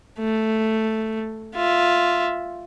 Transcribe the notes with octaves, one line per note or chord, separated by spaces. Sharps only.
A3
F4 E5